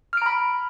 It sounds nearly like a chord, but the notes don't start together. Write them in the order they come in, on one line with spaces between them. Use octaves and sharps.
F6 D7 A#5 B5